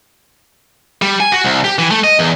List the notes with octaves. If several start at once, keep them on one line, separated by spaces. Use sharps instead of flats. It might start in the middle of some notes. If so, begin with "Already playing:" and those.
G3
G#5
F#4
C2
G4
E3
A3
D#5
E2